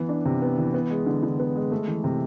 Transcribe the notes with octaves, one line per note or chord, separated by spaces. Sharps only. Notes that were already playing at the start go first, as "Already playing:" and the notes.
Already playing: E3 B3
D4
C3
B3
E3
B3
G#3
D3
D3
B3
G#3
A3
E3
C3